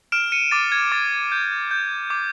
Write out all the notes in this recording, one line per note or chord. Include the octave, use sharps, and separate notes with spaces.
F6 D7 E7
C#7 D#7
D6 A6
G#6
D6 A6
G6
G6
D6